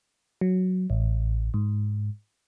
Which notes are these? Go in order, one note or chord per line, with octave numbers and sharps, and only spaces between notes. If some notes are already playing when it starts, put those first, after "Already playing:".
F#3
A1
G#2